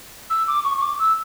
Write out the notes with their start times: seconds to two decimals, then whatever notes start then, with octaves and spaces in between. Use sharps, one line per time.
0.30 E6
0.48 D6
0.65 C#6
0.77 C#6
0.82 D6
0.99 E6